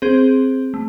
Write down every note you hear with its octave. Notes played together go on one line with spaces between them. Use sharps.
C4 G#4 C5
A3